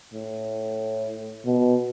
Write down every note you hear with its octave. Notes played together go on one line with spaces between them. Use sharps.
A2
B2